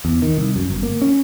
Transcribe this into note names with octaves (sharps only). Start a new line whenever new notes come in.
E2
D#3
C2
F#2
G1
A#3
C#4